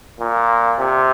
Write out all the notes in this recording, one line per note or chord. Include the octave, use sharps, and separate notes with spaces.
A#2
C3